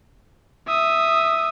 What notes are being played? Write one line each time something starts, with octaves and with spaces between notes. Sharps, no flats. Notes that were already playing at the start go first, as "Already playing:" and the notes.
E5 D#6